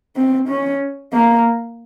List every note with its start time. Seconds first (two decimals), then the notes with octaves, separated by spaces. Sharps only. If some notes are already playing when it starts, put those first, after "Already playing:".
0.16 C4
0.49 C#4
1.13 A#3